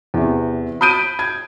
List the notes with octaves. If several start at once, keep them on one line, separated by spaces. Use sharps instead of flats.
E2 C3
B5 D#6 G6 D7 D#7
G#6